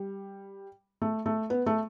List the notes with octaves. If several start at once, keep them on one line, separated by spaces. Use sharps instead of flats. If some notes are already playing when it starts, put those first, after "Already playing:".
Already playing: G3
A3
A3
B3
A3